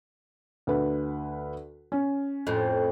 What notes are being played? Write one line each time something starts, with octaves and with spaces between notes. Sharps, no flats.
D2 B4
C#4
F2 A2